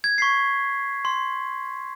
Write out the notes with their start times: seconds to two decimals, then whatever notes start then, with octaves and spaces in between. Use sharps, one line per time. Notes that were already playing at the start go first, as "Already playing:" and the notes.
0.04 G#6
0.18 C#6 B6 C7
1.05 C6